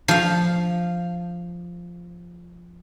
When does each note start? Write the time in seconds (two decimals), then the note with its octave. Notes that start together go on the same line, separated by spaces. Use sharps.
0.08 F3 F5